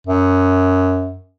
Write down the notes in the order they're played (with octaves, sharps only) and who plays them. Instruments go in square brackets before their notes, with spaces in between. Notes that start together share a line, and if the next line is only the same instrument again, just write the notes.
[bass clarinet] F#2